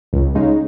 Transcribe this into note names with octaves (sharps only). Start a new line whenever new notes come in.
C#2
C#3 G#3 D#4